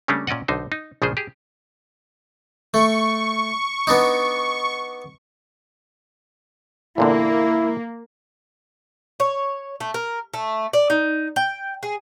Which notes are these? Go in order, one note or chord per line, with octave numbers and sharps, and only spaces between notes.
C#3 G3 A3 A#3 C#4 D4
A#2 C#4 D5 D#5 F#5
B1 D3 D#4 C5
D#4
A#1 C#3 F3 G#3 G#4 C5
G4 G#4
A3 C#6
B3 D4 D#4
E2 A#2 D3 A#3 E4
C#5
A3
A#4
A3
D5
D#4
G5
G#4